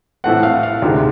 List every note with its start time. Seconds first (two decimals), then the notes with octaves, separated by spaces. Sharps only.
0.24 A2 E3 A3 C4 F#5
0.43 F5
0.63 F5
0.82 D2 C3 D#3 G#3